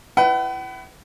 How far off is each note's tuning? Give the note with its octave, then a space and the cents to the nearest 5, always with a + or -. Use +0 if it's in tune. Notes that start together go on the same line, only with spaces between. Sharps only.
E4 +20 B4 +20 F#5 +45